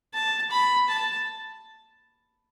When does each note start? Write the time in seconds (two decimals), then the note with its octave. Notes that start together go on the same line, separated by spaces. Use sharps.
0.14 A5
0.51 B5
0.89 A5